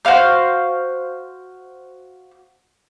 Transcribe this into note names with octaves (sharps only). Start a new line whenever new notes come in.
F#4 C5 F5 F6